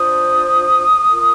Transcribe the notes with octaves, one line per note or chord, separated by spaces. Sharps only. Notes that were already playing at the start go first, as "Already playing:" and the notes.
Already playing: D4 F4 C5 D#6
F4 A#4